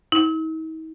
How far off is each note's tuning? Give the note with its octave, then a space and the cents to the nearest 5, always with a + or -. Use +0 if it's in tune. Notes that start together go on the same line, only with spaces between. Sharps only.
D#4 +45